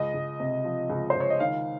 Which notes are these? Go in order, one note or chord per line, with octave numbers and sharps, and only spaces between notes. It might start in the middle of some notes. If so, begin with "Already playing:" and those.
Already playing: C#2 D#5
C#2
C3
F3
C#2
C#2 C5
C#5
D#5
D#3 F5